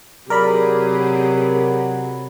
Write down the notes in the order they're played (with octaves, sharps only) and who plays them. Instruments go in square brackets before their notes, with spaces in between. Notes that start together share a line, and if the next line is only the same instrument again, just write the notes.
[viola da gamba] C3 [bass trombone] F#3 [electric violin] G4 G#4 [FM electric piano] A#4 D5 B5